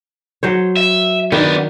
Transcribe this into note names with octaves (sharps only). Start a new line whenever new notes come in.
F#3 C5 C#5
E5
D#3 B3 D4